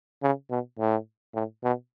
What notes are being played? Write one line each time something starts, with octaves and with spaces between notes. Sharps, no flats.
C#3
B2
A2
A2
B2